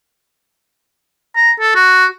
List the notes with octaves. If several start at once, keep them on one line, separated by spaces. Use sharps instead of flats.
A#5
A4
F#4